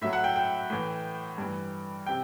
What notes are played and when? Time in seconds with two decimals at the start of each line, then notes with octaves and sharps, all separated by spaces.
0.02 A2 F#3 E5
0.13 F#5
0.24 G5
0.36 G5
0.70 A2 E3
1.38 G2 E3
2.06 C3 G5